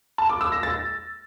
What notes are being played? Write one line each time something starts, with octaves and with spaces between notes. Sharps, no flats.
A5
D6
E6
A#6
A6